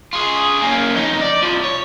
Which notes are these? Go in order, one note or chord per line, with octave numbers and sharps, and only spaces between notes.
F4 G#4
A#3 C#4
F2 D#4
D5
C2 F3
C#5